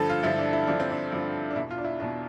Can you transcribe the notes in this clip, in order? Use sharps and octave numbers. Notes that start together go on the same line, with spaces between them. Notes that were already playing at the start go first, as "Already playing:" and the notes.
Already playing: G2 D3 F3 A4
F4
G2 D3 F3 E4
D4
E4
G2 D3 F3 D4
C4
D4
G2 D3 F3
D4
E2 B2 E4
F4
D4
E4
E2 B2 D4